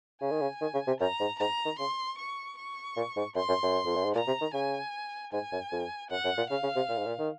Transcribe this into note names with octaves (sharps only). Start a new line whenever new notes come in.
C#3 G#5
D#3
C#3
D#3
C#3
C3
F#2 A#5
G#2
G#2 A#5
D#3
C#3 C6
C#6
C#6
A#2
G#2
F#2 C6
F#2
F#2
F2
F#2
G#2
A#2 A#5
C3
D#3
C#3 G#5
G#2 G#5
F#2
F2
F#2 F#5
F#2
A#2
C#3 F5
C#3
C3
A#2
G#2
A#2
D#3